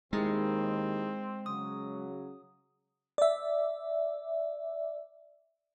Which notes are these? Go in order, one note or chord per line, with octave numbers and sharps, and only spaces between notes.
D#2 D#3 G#3 C4 D#4 E4 G#4
C#3 F#3 D#6
D5 E5